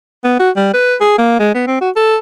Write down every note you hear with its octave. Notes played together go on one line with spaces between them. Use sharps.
B3
F#4
G3
B4
G#4
A#3
G#3
B3
C4
F#4
A4